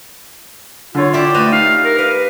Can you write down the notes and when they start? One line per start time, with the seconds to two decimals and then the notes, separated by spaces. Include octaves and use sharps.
0.95 D3 F4 C#5
1.13 E4 G4 D5
1.34 A3 B4 C5 D#5 F7
1.52 D#4 F5
1.85 A#4
1.98 B4 F5